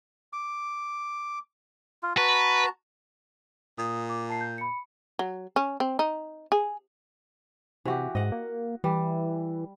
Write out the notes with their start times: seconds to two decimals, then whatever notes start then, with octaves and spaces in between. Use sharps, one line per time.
0.33 D6
2.03 F4
2.18 F#4 B4 A5 A#5
3.78 A#2 D#6
4.10 D6
4.29 A5 C7
4.41 G6
4.58 B5 C#7
5.19 F#3
5.56 C#4
5.80 C4
5.99 D#4
6.52 G#4
7.85 C3 E3 F#4 G4
8.15 G#2 D#5 F#5
8.32 A#3
8.84 E3 G3